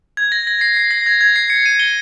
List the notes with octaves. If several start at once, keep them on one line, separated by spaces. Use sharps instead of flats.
G#6
A#6
A#6
C7
C7
A#6
G#6
G#6
C7
C#7
D#7
G7